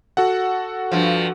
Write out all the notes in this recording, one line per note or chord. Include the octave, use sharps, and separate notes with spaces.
F#4 A4 F#5
G2 F3